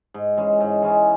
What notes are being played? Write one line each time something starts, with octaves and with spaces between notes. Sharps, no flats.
G#2
E3 G#3 C#4
G#2
E3 G#3 C#4